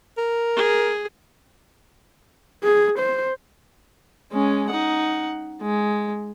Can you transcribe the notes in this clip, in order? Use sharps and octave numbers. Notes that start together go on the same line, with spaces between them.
A#4
G#4
G#4
C5
G#3 C#4
D#4 F#5
G#3